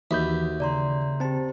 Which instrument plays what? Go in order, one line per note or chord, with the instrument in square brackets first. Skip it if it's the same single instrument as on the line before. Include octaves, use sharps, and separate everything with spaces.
[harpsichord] D#2 [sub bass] E3 [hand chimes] F#4 [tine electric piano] E5 B5 G6
[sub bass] C#3 [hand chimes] D5 A#5 C6
[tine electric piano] C4 A5 [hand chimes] G4 C5